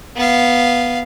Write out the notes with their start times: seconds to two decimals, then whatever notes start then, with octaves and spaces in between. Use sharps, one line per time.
0.16 B3 F5